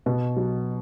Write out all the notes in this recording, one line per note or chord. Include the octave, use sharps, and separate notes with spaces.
B2
F#3